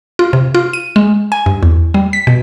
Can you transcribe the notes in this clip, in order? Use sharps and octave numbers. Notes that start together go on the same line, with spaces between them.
F4
C3
F4
D#7
G#3
G#5
G2
E2
G3
B6
B2